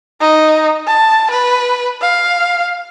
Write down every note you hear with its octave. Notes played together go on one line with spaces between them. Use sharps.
D#4
A5
B4
F5